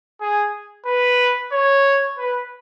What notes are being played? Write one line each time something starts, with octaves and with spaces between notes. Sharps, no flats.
G#4
B4
C#5
B4